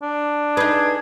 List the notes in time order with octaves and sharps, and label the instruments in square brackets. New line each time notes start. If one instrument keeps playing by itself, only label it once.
[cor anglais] D4
[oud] D#4 B4 [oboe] G#4